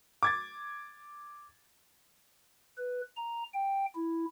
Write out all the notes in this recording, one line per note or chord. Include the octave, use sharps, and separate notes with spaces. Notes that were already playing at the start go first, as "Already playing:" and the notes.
D6 G#6 A6
B4
A#5
G5
E4